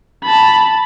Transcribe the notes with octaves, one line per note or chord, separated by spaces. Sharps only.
A5 B5